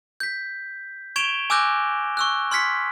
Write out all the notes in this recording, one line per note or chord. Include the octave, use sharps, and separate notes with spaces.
G6 B6
C#6 G#6 D7 E7 F7 G7
G#5 D6 E6 F#6 G6 A#6
C#6 E6 F#6
C6 F6 G#6 B6 C#7